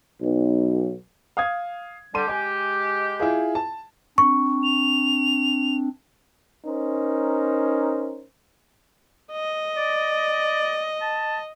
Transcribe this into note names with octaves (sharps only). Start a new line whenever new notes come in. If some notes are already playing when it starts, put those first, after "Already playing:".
B1
F5 D#6 G#6
D3 G3 G4 A5 C6 D#7
G#3 G4 G#5 D6
E4 F4 G#4
A5
C4 D4 C#6
F7
C#4 D#4 A#4 C5
D#5
D5
A5